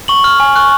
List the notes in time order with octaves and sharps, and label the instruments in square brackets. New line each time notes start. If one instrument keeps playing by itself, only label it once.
[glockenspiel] C#6 F#7
F6
G#5
C#6 F#6